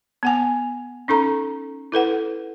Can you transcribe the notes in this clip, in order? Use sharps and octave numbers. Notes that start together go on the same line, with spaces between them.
B3 F#5 G#5
C#4 D#4 A4 A#5
E4 A4 B4 F#5